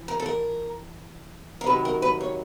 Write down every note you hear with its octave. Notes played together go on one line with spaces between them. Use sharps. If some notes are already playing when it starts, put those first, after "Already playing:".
Already playing: E3
A#4
A4
A#4
A#4
C3 D#3 F#3 B4
A#4
B4
C#5